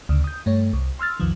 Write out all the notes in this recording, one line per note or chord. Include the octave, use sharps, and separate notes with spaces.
D2 C#3
D#6 G6
G2 A3 C#5
C2
C6 E6 F6 A6
B1 F2 D#3 F3